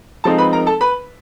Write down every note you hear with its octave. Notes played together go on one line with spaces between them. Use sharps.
F3 G#3 C4 D#4 A4 A5
B4 B5
A#4 A#5
A4 A5
B4 B5